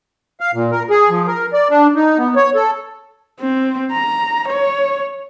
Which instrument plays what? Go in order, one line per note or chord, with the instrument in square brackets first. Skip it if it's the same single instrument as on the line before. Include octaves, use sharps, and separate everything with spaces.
[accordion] F5
A#2
A#4
G#4
F3
A#4
D5
D4
D#4
B3
C#5
A4
[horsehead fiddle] C4
A#5
C#5